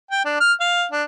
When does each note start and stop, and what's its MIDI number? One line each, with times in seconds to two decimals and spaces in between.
0.11 0.22 79
0.25 0.37 62
0.40 0.53 89
0.60 0.86 77
0.92 1.03 62